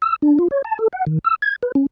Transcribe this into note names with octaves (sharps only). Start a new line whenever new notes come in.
E6
D4
F4
C#5
A5
A4
F#5
D#3
E6
G#6
B4
C#4